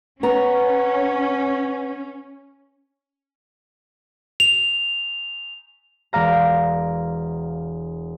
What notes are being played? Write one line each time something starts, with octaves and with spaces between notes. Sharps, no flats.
B3 C#4 A#5
F7
E1 D5 F5 A#5